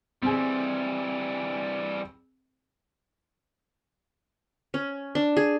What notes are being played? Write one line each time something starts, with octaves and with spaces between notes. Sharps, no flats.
E3 G3 C4 G#4
C#4
D4
G#4